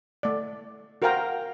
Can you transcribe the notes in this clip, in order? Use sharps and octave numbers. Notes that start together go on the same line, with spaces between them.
A3 D5
F#4 A#4 C5 F5 G5 A#5